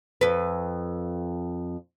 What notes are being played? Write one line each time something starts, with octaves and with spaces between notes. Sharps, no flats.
F2 B4